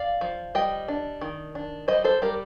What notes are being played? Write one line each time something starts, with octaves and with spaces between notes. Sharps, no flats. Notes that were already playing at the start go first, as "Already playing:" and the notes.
Already playing: D5 F5
F3
G3 D#5 G5
D4
D#3
D4
G3 C5 D#5
A4 C5
G3 G4 A#4